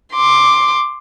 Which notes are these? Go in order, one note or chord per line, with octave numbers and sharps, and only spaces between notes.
C6 D6